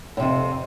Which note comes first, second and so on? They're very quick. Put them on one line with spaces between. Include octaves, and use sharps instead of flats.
A2 C3 F2